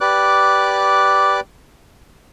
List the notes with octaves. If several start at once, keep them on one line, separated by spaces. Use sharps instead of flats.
G4 B4 D5 D6 F#6